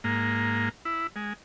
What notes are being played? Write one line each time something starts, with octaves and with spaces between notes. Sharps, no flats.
G#2 A#3
E4
G#3